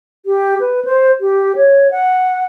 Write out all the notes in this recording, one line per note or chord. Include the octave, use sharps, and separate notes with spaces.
G4
B4
C5
G4
C#5
F#5